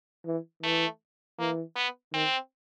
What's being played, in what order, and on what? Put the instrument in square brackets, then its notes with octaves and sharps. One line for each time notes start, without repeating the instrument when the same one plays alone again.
[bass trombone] E3
[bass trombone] E3 [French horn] A3
[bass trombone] E3 [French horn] A#3
[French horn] B3
[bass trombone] D#3 [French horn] C4